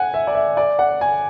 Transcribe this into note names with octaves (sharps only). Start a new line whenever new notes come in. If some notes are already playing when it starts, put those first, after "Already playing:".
Already playing: F#5 G#5
E5
D5
E5
D5
F#5
G#5